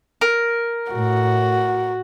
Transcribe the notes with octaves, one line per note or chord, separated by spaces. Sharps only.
A#4
A2 F#4